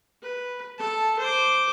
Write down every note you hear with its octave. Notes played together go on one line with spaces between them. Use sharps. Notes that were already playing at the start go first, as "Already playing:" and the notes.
B4
A4 A5
C5 D6